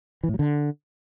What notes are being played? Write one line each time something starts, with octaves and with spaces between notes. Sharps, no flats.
E3
A2
F#3
D3